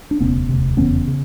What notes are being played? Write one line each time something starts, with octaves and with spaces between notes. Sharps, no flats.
D4
E1 D2 C3 B3 C#4
E1 D2 C3
F1 E2 C#3 B3 C#4
C#3